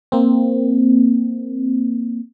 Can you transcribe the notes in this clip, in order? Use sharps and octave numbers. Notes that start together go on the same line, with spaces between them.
A#3 C4